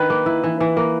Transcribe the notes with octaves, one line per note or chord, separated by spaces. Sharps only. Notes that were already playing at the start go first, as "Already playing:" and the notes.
Already playing: D#3 B4
A#3
E4
E3
E3
A#3